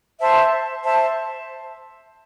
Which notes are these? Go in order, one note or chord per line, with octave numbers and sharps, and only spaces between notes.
C5 E5 A5
C5 E5 A5